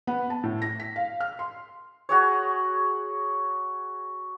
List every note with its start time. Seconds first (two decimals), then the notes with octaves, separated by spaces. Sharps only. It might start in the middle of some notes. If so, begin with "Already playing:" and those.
0.07 B3
0.30 A5
0.43 A2
0.62 A#6
0.80 B6
0.96 F5
1.20 F6
1.39 C6
2.09 F#4 G#4 C#5